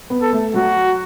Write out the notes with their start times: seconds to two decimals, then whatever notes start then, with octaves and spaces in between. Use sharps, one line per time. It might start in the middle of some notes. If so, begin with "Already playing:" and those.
0.10 B3
0.22 A4
0.33 A3
0.54 F#3 F#4